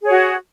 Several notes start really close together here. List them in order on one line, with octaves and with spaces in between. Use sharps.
G#4 C#5 F#4